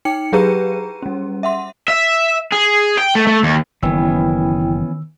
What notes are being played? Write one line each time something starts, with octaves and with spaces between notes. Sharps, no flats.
D#4 G5 C#7
F#3 G4 G#4 B4 A#5 D#7
G3 C#4
E5 F#5 C6
E5
G#4
G5
A3
A3
D#2
F#1 D#3 E3 B3 C#4 E4 G5 E6